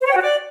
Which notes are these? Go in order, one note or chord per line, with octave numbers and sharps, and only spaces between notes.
C5
C#5
G5
F#4
D5